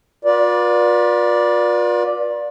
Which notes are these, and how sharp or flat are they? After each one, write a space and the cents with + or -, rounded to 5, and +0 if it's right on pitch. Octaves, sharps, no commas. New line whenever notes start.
F4 +35 B4 -40 D5 +0